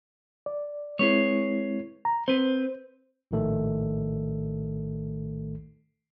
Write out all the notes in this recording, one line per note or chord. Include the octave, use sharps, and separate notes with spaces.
D5
G#3 C4 E4 G#4 B4 C#5
A#5
C4 B4 C5
A#1 A2 D#3 A3 A4